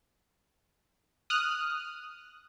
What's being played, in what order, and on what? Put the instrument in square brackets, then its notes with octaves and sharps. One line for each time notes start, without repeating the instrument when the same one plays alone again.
[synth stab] D#6 F6 F#6